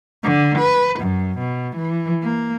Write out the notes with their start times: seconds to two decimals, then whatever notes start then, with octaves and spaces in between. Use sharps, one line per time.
0.23 D3
0.58 B4
1.00 F#2
1.39 B2
1.76 E3
2.22 A#3